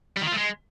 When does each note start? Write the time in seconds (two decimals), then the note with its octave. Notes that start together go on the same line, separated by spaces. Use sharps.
0.17 G3
0.22 D#3
0.27 F4
0.32 A3
0.38 G#3